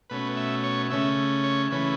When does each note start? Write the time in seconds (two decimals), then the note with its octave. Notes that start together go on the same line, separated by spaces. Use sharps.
0.10 B2 A3 C#4 B4
0.37 E5
0.64 C#5
0.90 C#3 A3 C#4 E5
1.44 C#5
1.70 C#3 E3 A3 C#4 B4